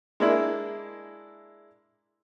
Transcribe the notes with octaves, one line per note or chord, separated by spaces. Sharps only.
G#3 A#3 D4 E4